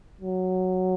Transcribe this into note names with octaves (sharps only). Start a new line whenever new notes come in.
F#3